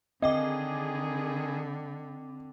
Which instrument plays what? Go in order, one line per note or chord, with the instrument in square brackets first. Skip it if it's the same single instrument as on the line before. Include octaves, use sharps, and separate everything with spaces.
[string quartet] D3 [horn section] D#3 G#4 [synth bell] C4 G5 D6 [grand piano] D#5